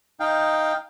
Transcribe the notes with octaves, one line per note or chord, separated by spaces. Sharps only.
D#4 F5 G5